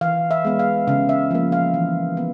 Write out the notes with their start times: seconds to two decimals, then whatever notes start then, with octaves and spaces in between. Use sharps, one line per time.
0.01 E3 F5
0.31 E5
0.45 G#3 B3
0.59 F5
0.87 C#3 F5
1.09 E5
1.31 F3 A#3
1.52 F5
1.74 E3
2.17 B3